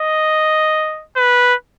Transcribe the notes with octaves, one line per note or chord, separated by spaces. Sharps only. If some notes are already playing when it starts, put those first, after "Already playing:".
Already playing: D#5
B4